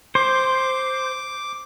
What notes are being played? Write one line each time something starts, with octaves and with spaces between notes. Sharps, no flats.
C5 D6